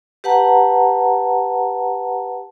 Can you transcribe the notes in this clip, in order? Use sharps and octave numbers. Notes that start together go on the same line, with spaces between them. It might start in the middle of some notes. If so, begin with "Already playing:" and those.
G4 B4 F#5 A5 A#5